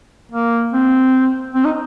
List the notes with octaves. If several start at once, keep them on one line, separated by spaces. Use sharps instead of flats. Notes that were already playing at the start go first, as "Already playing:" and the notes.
A#3
C4
C4
D#4